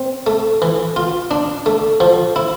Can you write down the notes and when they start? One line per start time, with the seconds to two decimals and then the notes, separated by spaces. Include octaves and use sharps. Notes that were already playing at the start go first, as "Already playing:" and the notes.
Already playing: C4
0.27 A3
0.62 E3
0.96 F4
1.31 D4
1.66 A3
2.00 F3
2.36 E4